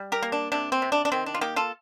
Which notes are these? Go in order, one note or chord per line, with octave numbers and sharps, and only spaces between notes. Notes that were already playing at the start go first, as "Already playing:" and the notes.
Already playing: G3
G4 A#4
A#3
D4
C3 D4
C4
C3
D4
D4
D#3 C4
D4
F4
A#3 D#4 G4
F4 A4